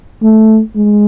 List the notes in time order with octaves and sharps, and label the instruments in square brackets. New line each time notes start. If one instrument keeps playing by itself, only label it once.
[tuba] A3
G#3